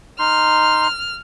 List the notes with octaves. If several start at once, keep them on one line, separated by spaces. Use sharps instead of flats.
D#4 C6 F6